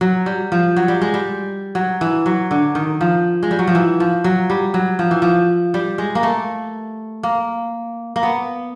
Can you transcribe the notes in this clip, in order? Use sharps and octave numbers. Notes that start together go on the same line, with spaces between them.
F#3
G3
F3
F#3
G3
G#3
G3
F#3
E3
F#3
D3
D#3
F3
G#3
G3
F#3
F3
E3
F3
F#3
G3
F#3
F3
E3
F3
G3
G#3
A#3
A3
A#3
A#3
B3